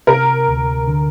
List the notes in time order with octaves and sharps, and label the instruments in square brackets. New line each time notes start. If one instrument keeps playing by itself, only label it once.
[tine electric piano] C3 [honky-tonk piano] A#4
[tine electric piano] D2
D3